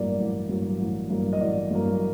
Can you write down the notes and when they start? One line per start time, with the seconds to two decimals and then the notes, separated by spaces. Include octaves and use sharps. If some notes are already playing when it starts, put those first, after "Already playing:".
Already playing: A1 G2 F#3 A#3 D5
0.19 A1
0.49 G2 F#3 A#3
0.79 A1
1.10 G2 F#3 A#3
1.33 D#5
1.40 A1 D5
1.71 G2 F#3 A#3